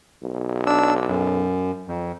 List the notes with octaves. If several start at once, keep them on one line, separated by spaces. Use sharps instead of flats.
B1
D4 E6
F#2
F2